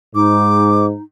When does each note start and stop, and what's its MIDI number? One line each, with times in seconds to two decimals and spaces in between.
0.15 0.93 44
0.15 1.02 63
0.15 0.86 86